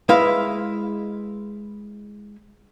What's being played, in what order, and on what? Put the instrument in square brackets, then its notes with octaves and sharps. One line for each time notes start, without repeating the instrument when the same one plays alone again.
[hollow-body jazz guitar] G#3 E4 B4 F5